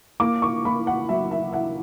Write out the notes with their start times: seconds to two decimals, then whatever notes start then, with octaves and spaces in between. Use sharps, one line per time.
0.20 A#3 D6
0.42 C#6
0.65 A#3 B5
0.87 F#5
1.09 F#3 E5
1.31 E5
1.53 E4 F#5